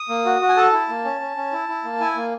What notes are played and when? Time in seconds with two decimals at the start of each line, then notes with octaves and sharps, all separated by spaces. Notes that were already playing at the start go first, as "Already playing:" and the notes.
Already playing: D#6
0.09 A#3
0.25 F#4
0.42 F#4
0.49 G#5
0.57 A4 A5
0.73 E4
0.89 A#3
1.05 C#4
1.21 C#4
1.37 C#4
1.52 E4
1.68 E4
1.84 A#3
2.00 E4 G#5
2.16 A#3